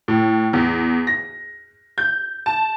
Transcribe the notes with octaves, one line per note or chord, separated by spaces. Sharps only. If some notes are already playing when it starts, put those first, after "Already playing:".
A2
E2
A#6
G6
A5